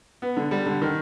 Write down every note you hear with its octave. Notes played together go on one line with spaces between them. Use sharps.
B3
D3
G3
D3
D#3